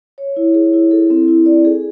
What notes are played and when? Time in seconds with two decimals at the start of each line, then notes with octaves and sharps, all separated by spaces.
0.18 C#5
0.37 E4
0.54 G#4
0.74 E4
0.91 A4
1.10 C4
1.28 E4
1.46 D5
1.65 G#4